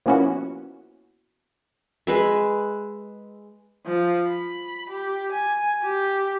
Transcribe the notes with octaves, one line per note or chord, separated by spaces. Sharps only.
F3 A#3 B3 C#4 E4 F#4
G#3 B4 E5
F3
B5
G4
G#5
G4